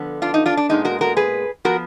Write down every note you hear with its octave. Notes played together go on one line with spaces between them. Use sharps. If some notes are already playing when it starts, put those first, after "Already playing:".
Already playing: D3 F3 B3
D4 F4
D#4
D4 F4
D4
A#2 G#3 B3 D#4
F#4 A#4
F#4 A#4
G#4 B4
F3 B3 F#4 A#4